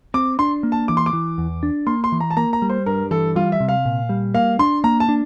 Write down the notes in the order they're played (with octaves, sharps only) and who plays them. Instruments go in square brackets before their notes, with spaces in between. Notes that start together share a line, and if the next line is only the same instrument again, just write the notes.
[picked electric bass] C4 [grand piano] D6
[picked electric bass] D4 [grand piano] C6
[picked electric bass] A#3
[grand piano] A5
[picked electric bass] E3 [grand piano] D6
[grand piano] C6
D6
[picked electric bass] E3
E2
D4
[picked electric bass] A#3 [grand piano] C6
[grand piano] C6
[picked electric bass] E3
[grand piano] A#5
A5
[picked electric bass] A#3 [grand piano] A#5
[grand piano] A#5
[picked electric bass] G3
[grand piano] C5
[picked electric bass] G2 [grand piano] A#4
[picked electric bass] E3 [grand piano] A4
[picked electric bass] G3 [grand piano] F4
[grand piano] E5
[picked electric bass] C3
[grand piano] F5
[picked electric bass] A#2
G3
[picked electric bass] A#3 [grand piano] F5
[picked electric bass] D4 [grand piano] C6
[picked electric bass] A#3 [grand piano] A#5
[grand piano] A5
[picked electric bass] D4